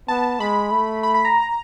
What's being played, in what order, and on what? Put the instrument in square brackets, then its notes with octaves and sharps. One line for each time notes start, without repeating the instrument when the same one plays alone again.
[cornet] B3 [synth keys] A5
[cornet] G#3 [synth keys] B5
[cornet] A3
[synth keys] B5
B5
A#5